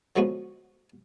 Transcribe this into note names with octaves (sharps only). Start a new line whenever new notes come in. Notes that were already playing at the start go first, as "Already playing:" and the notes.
D3 F3 F#3 G#3 B3 F#4